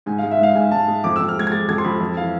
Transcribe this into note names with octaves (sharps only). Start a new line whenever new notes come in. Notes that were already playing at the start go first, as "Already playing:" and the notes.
G#2 G#5
G#3 F5
E5
G#2 F5
G#2 G#5
G#2 A5
G#3
F2 D6
F2 E6
F6
G#3 G#6
G#6
G#3 A6
F2 G#6
C6
F2 B5
F2
E3 F5